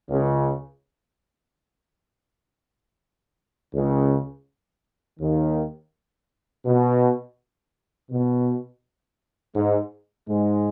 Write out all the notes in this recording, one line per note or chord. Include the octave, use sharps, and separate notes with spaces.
C#2 C#3
C#2 C#3
D#2 D#3
B2
B2
G#2 G#3
G#2 G#3